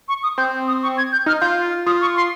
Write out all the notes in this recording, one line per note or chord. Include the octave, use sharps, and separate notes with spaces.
C#6
D#6
C4 G6
D#6
C#6
G#6
G6
D#4 F6
F4 G6
F4 D#6
C#6
C6